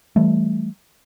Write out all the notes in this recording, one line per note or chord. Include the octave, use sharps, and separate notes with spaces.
E3 G3 A3